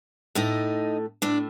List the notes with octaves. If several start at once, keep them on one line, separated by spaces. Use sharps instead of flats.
A2 A3 D#4 D#5
A2 A3 D4 D5